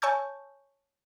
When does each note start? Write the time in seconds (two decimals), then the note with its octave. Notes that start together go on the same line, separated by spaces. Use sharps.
0.02 C#5 G#5 A5 C#6 E6 G6